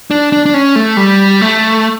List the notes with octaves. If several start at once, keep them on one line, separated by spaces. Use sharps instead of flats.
D4
D4
D4
C#4
A3
G3
A3